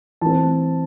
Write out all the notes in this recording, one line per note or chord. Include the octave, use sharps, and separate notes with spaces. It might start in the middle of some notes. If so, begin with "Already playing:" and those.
E3 A3 C4 A5